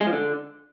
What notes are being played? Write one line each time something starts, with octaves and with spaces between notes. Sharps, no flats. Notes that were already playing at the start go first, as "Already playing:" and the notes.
G#3
F3
D3